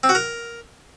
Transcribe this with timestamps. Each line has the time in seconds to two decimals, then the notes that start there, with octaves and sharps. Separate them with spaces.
0.03 C4
0.09 F#4
0.15 A#4